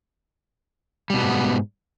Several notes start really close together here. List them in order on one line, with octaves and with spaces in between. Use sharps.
G3 B2 B3 G#2